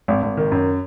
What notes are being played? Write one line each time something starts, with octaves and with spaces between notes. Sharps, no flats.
G#1
G#1
D#3
F#2